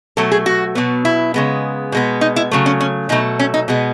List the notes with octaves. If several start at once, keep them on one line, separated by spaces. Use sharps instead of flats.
B2 F#3 A3 A4
G#4
F#4
B2 F#3 B3
E4
C#3 G#3 B3
B2 G#3 B3
D#4
E4
C#3 F#3 A3
C#4
C#4
B2 F#3 A3 D#4
C#4
D#4
B2 G#3 B3